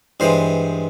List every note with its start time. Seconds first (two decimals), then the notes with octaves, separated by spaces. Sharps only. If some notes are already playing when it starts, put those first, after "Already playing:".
0.20 G2 E3 G#3 C5